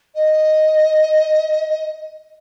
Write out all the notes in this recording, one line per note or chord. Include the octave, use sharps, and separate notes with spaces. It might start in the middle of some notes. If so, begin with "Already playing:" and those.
D#5